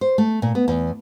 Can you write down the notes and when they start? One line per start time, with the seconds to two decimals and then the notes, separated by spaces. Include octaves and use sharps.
0.01 C5
0.18 A3
0.42 A#2
0.55 B3
0.68 E2